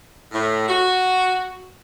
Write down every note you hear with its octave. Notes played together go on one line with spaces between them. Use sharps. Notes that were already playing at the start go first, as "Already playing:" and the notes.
A2
F#4